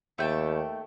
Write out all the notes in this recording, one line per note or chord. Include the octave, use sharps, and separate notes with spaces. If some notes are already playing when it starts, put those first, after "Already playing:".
D#2 A3 G5 A5